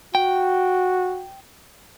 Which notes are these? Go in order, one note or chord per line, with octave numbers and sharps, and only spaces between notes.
F#4 G5